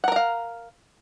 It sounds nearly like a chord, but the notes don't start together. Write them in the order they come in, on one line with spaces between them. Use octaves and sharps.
F#5 A#4 A#5 F5